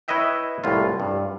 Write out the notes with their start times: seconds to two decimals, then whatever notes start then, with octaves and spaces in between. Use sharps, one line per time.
0.08 E4 B4 C#5 D#5 E5 G5
0.64 C2 A2 F4
1.00 G2